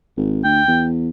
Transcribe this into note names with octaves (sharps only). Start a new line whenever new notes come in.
G#1
D2 G5
E2